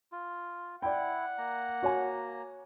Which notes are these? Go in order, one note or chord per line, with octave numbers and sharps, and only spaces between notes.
F4
E4 D5 F#5 G5
A#3 A#5
F#4 C#5 G#5